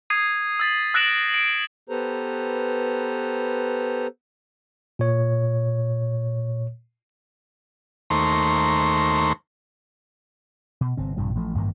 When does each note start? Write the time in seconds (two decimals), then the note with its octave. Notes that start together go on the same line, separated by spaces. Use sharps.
0.10 D#6 G#6 C7 D#7
0.60 E6 A6 B6
0.94 E6 F#6 A#6 D7 E7 F#7
1.34 D7
1.89 B3 G4 A4 B4 C5 A#5
4.99 A#2 C#5
8.10 D#2 A3 C5 A#5 C6 C#6
10.81 B2
10.97 G1 C3 C4
11.17 A#1 G2 C3 F3
11.35 A1 F3 A3
11.55 A1 G2 D#3 A#3